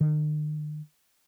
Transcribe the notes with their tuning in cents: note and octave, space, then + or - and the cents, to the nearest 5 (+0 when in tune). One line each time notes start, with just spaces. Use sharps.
D#3 -45